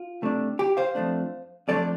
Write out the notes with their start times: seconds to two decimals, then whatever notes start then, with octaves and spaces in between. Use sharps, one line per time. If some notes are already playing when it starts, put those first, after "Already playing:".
Already playing: F4
0.22 C3 A3 D4
0.59 G4
0.77 C5 F5
0.95 F2 F3 A3 D4
1.68 F2 F3 A3 D4 A4 D5